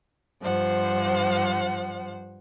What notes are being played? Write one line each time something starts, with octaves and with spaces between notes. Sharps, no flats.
G2 F3 C5 F#5